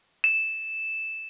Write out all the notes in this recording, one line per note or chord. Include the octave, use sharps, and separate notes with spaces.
E7